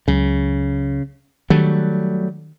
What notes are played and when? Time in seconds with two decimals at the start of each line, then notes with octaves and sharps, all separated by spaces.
0.08 C#2 C#3 F#3
1.50 D#3 F#3 G3 A3 D4